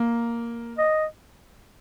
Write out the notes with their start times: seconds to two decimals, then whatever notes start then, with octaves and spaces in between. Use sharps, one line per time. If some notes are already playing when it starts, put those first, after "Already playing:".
Already playing: A#3
0.78 D#5